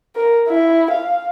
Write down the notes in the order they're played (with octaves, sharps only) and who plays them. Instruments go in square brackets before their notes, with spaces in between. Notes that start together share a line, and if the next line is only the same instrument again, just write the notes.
[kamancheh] A#4
E4
F5